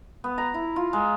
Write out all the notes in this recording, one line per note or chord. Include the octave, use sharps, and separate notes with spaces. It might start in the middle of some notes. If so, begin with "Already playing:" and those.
B3
A#5
E4
F4
G#3